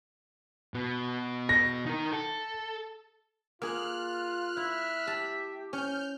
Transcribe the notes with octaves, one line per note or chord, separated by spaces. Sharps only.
B2 B3
A#6
D#4 A#4
A4
A#3 F4 G#4 F6 F#6
E4 E5
G4 A5
C#4 F6 G6